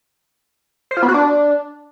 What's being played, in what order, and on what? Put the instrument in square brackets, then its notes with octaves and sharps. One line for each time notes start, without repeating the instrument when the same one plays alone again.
[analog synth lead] C5
F4
B3
F#4
D4